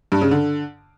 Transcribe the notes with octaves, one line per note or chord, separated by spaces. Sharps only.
G2
C#3
D3